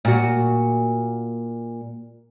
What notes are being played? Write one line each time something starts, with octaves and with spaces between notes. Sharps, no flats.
A#2 F#4